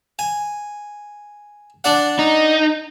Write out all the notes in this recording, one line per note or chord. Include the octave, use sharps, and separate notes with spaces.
G#5
D4 D5 F#5
D#4